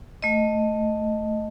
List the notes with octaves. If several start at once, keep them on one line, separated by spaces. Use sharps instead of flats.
A3 D#5